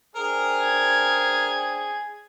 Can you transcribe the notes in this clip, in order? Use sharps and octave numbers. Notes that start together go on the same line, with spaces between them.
D4 G#4 A#4 C5 G5
G#6